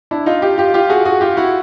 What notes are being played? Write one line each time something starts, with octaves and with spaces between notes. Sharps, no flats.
D4 E4
D#4 F4
F4 G4
F4 G4
F4 G4
F#4 G#4
F#4 G#4
F4 G4
E4 F#4